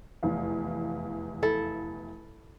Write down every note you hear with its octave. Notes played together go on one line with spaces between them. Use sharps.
F1 E2 F5
E4 A4